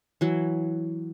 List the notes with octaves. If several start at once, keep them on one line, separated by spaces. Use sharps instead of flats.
E3 F#3